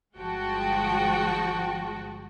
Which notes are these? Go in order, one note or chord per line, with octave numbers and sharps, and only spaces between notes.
G1 F3 G#3 F#4 G5 A5